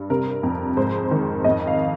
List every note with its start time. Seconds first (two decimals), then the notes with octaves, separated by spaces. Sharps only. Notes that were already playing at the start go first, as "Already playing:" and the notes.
Already playing: G2
0.10 C3 A#4
0.43 F2
0.77 G#2 C5
1.11 D#3
1.44 F2 D#5
1.67 F5